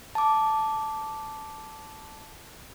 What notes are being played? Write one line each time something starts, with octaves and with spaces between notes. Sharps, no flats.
A5 D6